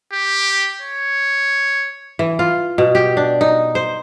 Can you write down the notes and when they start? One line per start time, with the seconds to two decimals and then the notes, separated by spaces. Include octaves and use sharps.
0.13 G4
0.82 C#5
2.19 E3
2.39 F4
2.78 B2
2.95 G4
3.17 D4
3.41 D#4
3.75 C5